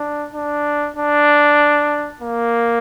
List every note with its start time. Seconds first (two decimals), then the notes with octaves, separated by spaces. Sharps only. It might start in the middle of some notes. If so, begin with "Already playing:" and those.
Already playing: D4
0.34 D4
0.97 D4
2.22 A#3